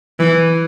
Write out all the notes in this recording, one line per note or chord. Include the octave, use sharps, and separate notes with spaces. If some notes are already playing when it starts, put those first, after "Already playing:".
E3